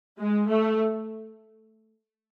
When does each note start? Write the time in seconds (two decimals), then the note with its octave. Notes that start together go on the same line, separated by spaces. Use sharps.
0.19 G#3
0.50 A3